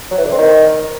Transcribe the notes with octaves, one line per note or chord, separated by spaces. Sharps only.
F#3
E3
D3
C4
D#3